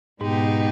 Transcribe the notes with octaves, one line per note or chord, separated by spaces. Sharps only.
G#2 B2 G#3 B3 D#4 G4